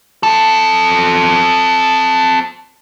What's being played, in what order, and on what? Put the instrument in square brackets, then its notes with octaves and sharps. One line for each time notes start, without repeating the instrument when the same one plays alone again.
[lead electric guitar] C4 A4